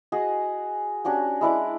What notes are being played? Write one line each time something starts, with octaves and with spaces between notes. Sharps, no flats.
F#4 G#4 D#5
C#4 D4 F#4 G4
G#3 E4 D5 D6